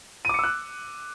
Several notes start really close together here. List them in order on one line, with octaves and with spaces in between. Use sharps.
D#7 D6 C#7 E6 F#6